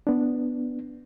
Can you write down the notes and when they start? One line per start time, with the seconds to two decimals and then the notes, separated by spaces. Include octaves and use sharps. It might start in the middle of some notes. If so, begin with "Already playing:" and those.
0.07 B3 D4